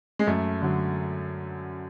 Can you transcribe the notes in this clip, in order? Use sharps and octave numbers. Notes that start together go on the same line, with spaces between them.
G#3
F#2 A3
D3 F#3